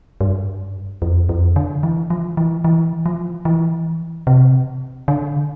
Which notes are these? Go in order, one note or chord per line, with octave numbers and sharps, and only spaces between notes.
G2
F2
F2
D3
E3
F3
E3
E3
F3
E3
C3
D3